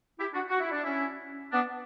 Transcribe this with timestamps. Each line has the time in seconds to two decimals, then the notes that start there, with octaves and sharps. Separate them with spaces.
0.19 E4 G4
0.33 D4 F#4
0.49 F#4
0.60 E4
0.71 D4
0.84 C#4 E4
1.52 B3 D4